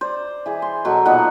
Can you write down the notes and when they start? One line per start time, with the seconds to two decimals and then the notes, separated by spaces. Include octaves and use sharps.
0.01 C5 D5
0.46 E3 G#4
0.62 C6
0.85 B2 F#3 F#4 A4
1.05 A#2 B3 D#4 F#5